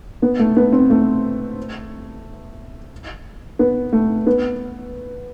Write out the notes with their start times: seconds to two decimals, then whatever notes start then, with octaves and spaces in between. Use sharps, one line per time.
0.22 B3
0.39 A3
0.57 B3
0.73 C4
0.90 A3
3.59 B3
3.92 A3
4.27 B3